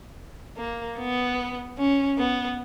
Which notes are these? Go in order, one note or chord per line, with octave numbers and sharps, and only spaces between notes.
A#3
B3
C#4
B3